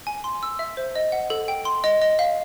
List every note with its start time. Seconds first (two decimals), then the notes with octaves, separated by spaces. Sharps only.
0.07 G#5
0.24 C6
0.43 E6
0.59 E5
0.77 C5
0.96 D#5
1.12 F#5
1.30 A4
1.48 G5
1.65 C6
1.84 D#5
2.02 D#5
2.19 F5